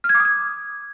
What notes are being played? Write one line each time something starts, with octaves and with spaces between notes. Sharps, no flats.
F6
G#6
D6
D#6
G#6